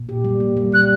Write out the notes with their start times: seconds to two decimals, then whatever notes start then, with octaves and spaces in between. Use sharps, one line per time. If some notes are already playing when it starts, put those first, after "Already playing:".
Already playing: A#2
0.09 G4
0.25 G3
0.40 A#3
0.57 G3
0.72 G3 F#6